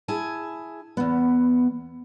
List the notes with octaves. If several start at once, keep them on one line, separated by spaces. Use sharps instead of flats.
E4 G#4 G#5 A5
E2 B3